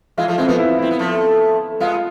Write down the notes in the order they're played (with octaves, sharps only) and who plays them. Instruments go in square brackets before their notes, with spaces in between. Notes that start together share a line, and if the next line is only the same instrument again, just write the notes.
[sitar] E3 G#3 [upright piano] F4
[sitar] F3 A3
[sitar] E3 G#3 [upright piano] C4
[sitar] F3 A3 [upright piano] B3
[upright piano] E4
[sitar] C4 [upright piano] E4
[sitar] B3
F3 A3
[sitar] G#3 B3 [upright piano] F4